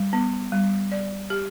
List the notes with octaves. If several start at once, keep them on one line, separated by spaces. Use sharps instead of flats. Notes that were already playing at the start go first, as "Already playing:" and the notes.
Already playing: G3
B3
G3
D5
G4